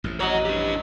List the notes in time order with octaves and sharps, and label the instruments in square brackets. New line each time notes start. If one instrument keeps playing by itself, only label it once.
[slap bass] A1 F2 A2
[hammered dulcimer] F#3 D#5 [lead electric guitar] C#5 F#5
[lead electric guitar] D4 G4